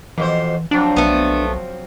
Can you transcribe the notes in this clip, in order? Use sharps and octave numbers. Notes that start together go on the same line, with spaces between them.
F2 B2 E3 C5
F3 F#3 C4 D4
B1 A3 B3